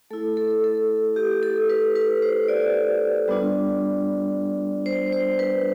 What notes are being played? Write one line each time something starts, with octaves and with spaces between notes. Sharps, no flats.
A3 E4 A4
A4
A4
G4
A4
B4
B4
C5
D5
G3 B3 D4 F4
C5
C5
B4